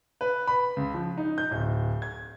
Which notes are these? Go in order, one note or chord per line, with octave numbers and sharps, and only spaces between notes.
B4
B5
C#2
F3
D#4
G6
D1
G#6